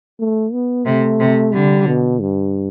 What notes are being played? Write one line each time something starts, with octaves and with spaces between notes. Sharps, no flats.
A3
B3
C3 A3
C3
D3 G3
B2
G2